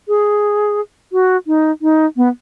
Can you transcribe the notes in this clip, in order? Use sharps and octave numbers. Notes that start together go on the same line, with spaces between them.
G#4
F#4
D#4
D#4
B3